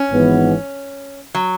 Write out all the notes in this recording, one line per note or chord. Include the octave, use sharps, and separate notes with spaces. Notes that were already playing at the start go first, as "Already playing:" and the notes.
Already playing: C#4
G#1 G#2 E3 B3
F#3